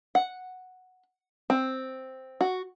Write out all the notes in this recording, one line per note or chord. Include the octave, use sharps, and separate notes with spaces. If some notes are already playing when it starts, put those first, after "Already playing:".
F#5
C4
F#4